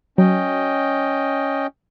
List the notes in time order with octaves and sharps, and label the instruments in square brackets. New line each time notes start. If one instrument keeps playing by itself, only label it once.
[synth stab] F#3 [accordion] C#4 D#5 G5